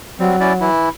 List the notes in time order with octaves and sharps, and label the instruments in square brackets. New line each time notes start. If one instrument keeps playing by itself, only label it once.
[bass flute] F#3 [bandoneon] G3 C4
[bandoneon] C#4 E4 D5
E3 E4